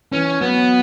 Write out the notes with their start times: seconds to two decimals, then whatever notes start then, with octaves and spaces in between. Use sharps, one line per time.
0.12 E3 C#4
0.41 F#3 B3